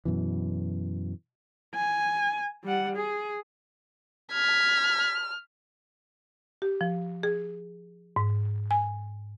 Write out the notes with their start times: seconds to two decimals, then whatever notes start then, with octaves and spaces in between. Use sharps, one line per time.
0.05 F#2 B2 E3
1.75 G#5
2.64 G3 F#5
2.96 G#4
4.33 F6 G#6 B6
6.62 G4
6.81 F3
7.23 G#4
8.16 G#2
8.71 G#5